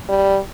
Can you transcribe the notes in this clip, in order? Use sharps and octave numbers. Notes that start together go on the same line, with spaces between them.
G3